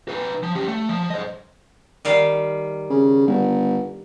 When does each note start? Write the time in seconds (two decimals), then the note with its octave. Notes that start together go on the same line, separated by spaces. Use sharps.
0.09 D#4 B4
0.43 F3
0.55 C#4 G4
0.68 A3
0.89 F3
1.10 C5 D#5
2.05 D#3 G3 F5
2.90 C#3
3.27 G1